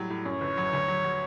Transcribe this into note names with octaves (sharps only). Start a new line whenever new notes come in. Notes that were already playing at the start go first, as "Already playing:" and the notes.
Already playing: A2 F#3 G3
A2
F#2 C#5
G1
F#3
D2
F#3
F#3